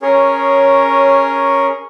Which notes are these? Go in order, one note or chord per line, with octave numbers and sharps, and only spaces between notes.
C#4 G#4 A#4 C#5